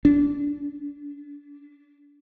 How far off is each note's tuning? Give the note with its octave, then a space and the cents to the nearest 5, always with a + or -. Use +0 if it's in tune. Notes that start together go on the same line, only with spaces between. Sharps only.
D4 -25